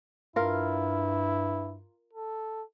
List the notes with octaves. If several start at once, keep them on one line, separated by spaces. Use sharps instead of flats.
G2 E4 F4 A#4
A4